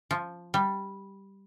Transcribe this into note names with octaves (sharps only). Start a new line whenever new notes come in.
F3
G3